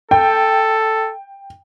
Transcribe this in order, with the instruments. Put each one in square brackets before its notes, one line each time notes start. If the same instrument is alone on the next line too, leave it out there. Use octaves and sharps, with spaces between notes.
[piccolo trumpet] A4 [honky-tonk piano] G5